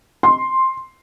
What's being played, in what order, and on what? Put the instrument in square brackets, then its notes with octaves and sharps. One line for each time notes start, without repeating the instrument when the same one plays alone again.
[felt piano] C6